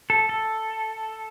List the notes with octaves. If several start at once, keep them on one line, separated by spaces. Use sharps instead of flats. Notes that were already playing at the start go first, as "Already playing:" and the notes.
A4
A4